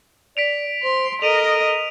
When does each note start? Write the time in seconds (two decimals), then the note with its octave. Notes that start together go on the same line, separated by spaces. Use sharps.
0.37 D5 B6 D7 F7
0.83 C5 C6
1.22 A4 A#4 D#5 D7 D#7 F7